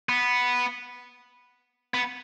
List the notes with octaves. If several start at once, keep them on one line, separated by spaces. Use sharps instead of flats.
B3
B3